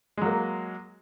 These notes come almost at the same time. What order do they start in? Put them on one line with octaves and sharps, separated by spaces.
G#3 F#3 A#3